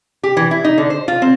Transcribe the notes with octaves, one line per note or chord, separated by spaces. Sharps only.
G4
E3
E4
D#4
D3
C5
F4
C4